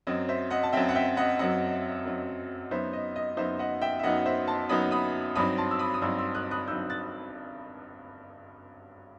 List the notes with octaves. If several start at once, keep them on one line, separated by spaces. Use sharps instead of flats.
F#2 F#3 C4 D#5
C5 E5
D#5 F#5
A5
F#2 F#3 C4 E5 G5
F#5
E5 G5
D#5 F#5
F#2 F#3 C4 D#5 F#5
F#2 F#3 C4
F#2 F#3 B3 D#4 C5 E5
D#5
D#5
F#2 F#3 B3 D#4 C5 E5
D#5 F#5
E5 G5
E5
F#2 F#3 B3 D#4 D#5 F#5
C5 E5
A5 C6
F#2 F#3 B3 D#4 B5 D#6
B5 D#6
G2 F#3 C4 D#4 B5 D#6
A5 C6
E6
B5 D#6
D#6
G2 F#3 C4 D#4 C6 E6
C6 E6
D#6 F#6
D#6 F#6
G2 F#3 C4 D#4 E6 G6
F#6 A6